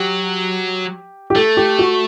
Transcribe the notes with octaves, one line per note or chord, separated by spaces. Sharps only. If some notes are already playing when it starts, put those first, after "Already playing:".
Already playing: F#3 G4
G4
A3 A4
G4
F#4